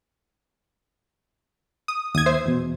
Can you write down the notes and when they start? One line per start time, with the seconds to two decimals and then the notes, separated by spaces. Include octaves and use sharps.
1.88 D#6
2.15 D#2 D#6 G#6
2.26 C5 E5
2.46 E2 B2